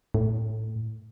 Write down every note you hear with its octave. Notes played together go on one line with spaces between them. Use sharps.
A2